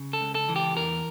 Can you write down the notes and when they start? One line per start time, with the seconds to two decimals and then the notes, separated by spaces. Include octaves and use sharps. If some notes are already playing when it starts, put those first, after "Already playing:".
Already playing: C#3
0.13 A4
0.21 C#2
0.35 A4
0.49 E3
0.56 G4
0.77 E2 A#4